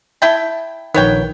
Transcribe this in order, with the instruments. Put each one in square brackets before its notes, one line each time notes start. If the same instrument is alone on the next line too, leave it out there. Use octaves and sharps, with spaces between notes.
[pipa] E4 G5 A5
[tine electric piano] A#1 D#3 [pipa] B3 C#5 G5